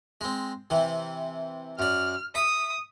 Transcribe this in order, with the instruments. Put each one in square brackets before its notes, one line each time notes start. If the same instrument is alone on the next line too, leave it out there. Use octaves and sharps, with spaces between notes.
[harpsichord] G#3 C4
C3 E3
[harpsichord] F#2 D5 [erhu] F6
[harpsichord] E5 [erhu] D#6